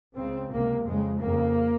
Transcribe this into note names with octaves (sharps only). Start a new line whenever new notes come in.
C#2 C#3 C4
C#2 C3 A#3
F2 C#3 G#3
F2 C#3 A#3